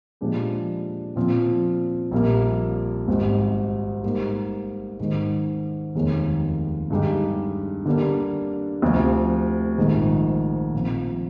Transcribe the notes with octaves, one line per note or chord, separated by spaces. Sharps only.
A#2 F3 G#3 D4 G4
A#2 F3 C4 F4
A#1 A#2 G3 A#3
G#1 G#2 G3
G#2 G3 A#3 D#4
G#2 D#3 G#3 D#4
F1 D#2 D#3 G#3
G2 D3 G#3 D#4 G4
D3 G3 A#3 D4
D2 C3 F3
A#1 G#2 D#3 G#3 D#4
A#2 F3 C4